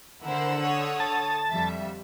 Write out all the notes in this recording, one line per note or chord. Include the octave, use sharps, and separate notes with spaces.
D3 E4 A#4 C5 F#5 E6
A4 C#5 D#6
A5
F2 G3 E5